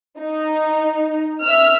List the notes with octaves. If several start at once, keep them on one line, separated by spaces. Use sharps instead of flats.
D#4
E5 E6 F6